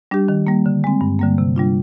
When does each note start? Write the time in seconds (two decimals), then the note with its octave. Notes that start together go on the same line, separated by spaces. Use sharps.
0.11 G3 D4 G4
0.28 D#3
0.47 G3 A#3
0.66 D3
0.84 G#3 C4
1.01 G2
1.19 D3 G3 A#3
1.38 C3
1.56 G3 D4 F4